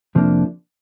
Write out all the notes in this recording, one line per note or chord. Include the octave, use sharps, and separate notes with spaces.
F2 C3 F3 A#3 D4